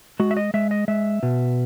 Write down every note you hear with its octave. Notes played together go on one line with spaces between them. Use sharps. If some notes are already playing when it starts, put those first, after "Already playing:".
G#3 F#4
E5
D#5
G#3 E5
D#5
G#3 E5
B2